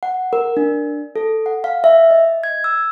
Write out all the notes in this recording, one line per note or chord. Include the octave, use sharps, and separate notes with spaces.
F#5
A#4
D4
A4
F#5
F5
E5
D#5
G#6
E6